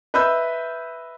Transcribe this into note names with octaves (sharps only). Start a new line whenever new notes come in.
B4 D#5 E5 B5 E6 G6